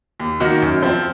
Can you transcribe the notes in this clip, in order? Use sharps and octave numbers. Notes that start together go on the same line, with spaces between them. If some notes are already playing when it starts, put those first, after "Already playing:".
D#2
D#3 A#3 D#4 F#4
F#2
F3 C4 F4